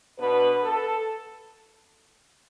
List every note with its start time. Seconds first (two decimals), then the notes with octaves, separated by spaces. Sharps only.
0.19 B2 B3 D4 B4
0.64 A4